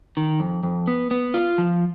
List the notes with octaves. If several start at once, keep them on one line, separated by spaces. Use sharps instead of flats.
D#3
F2
F2
B3
B3
F4
F3